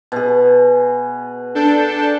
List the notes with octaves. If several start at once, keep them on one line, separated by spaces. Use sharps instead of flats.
B2 G#4
D4 A4 G6